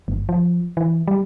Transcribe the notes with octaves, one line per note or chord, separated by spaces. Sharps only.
G1
F3
E3
G3